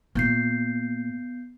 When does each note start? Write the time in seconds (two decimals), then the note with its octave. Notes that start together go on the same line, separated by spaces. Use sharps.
0.15 A#2 B3 G6 C7